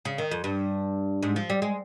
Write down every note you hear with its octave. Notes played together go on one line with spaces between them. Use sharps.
C#3
D#3
F2
G2
G#2
F3
G3
G#3